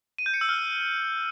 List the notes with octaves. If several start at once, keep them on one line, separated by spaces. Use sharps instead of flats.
D#7
G6
C#7
E6
F6